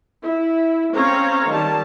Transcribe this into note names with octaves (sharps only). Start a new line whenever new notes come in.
E4
C4 C#4 C#5 F5 A#5
D#3 G3 A5